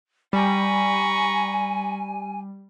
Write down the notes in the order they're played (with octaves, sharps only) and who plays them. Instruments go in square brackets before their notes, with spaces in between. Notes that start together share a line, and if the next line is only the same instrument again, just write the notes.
[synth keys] G3 [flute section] G#5 [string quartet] A#5 B5 C#6